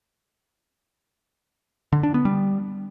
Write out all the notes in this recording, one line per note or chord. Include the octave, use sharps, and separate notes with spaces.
D3
D4
B3
G3